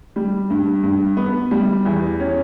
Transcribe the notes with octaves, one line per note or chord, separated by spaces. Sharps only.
G3
G2
G2
B3
G3
E2
C#4